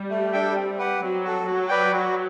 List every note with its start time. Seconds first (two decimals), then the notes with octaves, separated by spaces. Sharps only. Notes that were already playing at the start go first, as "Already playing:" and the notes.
Already playing: G3
0.10 A3
0.33 D4 A4 E5 G5
0.56 C4
0.78 G4 B4 F#5
1.01 F#3 C4
1.23 F#4 A4
1.46 F#3 F#4
1.69 B4 D5 G5
1.93 F#4